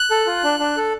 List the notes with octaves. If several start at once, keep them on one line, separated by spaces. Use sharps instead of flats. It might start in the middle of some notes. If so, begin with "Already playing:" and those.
Already playing: F#6
A4
F4
D4
D4
A4